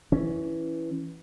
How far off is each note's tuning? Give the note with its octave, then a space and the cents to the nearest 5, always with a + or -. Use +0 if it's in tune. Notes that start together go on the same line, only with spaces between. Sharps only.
E3 +0 C#4 +0